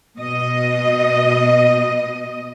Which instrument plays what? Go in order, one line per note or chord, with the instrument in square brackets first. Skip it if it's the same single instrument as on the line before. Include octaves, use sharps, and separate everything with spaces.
[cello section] B2 D#5